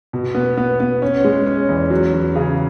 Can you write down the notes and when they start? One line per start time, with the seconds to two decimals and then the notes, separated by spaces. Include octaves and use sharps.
0.13 B2
0.35 B3
0.57 B3
0.80 B3
1.02 C#4
1.24 G#3
1.46 C#4
1.69 E2
1.91 F#3
2.14 F#3
2.36 C#3